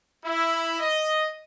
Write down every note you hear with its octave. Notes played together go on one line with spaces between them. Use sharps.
E4
D#5